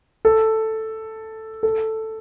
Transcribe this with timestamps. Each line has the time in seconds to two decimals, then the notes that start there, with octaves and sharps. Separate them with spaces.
0.25 A4
1.63 A4